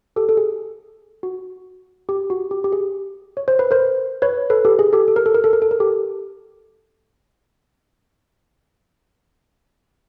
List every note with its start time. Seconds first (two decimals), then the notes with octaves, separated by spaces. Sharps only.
0.16 G4 A4
0.29 A4
0.37 G#4
1.23 F#4
2.09 G4
2.30 F#4
2.51 G4
2.64 G4
2.72 G#4
3.37 C#5
3.48 C5
3.59 B4
3.71 A#4 C5
4.22 B4 C#5
4.50 A4 B4
4.65 G4 A4
4.79 G#4
4.93 G4 A4
5.08 A4
5.16 A#4
5.26 A4
5.35 A#4
5.44 A4
5.53 A#4
5.62 A4
5.71 A#4
5.80 G4 A4